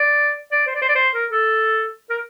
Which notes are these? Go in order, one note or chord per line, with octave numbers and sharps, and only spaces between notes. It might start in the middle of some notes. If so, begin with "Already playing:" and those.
Already playing: D5
D5
C5
D5
C5
D5
C5
A#4
A4
A#4